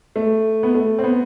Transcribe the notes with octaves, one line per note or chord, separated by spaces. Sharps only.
A3
B3
A3
C4
B3